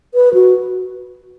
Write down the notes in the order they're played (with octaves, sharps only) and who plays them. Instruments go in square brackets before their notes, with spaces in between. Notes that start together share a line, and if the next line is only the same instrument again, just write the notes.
[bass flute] B4
F#4